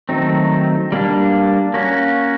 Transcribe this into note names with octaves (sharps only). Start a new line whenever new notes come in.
D#3 F#3 A3 C4 D#4
G3 A#3 D4
A#3 C#4 F#4